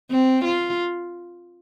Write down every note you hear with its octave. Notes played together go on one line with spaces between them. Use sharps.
C4
F4